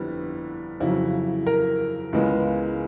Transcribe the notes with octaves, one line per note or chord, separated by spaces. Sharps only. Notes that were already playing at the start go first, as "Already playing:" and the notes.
Already playing: G1 F2 D3 G3 B3 E4
F2 C#3 F#3 E4
A#4
C#2 C#3 E3 G#3 B3